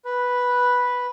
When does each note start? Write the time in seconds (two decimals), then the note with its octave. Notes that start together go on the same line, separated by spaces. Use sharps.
0.05 B4